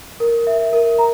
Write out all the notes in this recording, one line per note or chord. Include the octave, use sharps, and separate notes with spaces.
A#4
E5
A#4
A#5